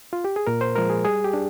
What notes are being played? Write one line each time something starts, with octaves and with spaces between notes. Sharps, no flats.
F4
G4
G#4
A#2 A#4
C5
F3 G#3 A#4
G#4
G3 G#4
G4
D4